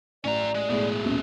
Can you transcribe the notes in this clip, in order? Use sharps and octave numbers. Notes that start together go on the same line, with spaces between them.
A1 C#4 D5 A#5
G#3
B1 A2 G#3 A3 G#4
D#1 A#1 B2 C#4